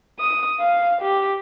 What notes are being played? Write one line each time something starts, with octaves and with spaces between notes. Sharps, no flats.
D#6
F5
G4